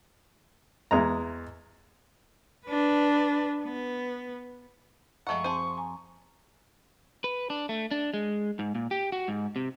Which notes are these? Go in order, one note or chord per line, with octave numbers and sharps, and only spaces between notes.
E2 G#3 A#5
D4 B4
B3
F#2 F3 G#3 A3 F#5 C#6
C4 G#4 C5 A5
G#5 A#5
B4
D4
A3
D4
G#3
G#2
A#2
G4
F#4
G#2
C3